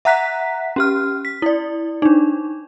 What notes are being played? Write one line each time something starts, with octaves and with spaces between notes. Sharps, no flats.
E5 F#5 A#5 F#6 B6
C#4 G4 F6
B6
E4 D5
D4 D#4